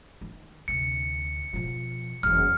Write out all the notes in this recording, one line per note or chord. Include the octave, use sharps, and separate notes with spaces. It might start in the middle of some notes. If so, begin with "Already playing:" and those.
D#3
D2 C3 C#7
B2 F3
F#1 E2 F6